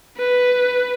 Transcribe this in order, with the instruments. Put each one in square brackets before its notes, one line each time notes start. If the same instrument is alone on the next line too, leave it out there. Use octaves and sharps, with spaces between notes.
[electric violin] B4